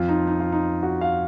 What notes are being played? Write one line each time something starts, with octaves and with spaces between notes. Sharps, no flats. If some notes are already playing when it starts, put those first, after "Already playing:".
Already playing: F2 F3 F4
D#4
D#4
F4
D#4
F#4
F5